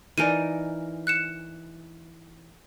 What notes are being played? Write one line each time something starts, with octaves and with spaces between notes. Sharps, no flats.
E3 D#4 A#4 D5 G#5 D#7
F#6 C#7 E7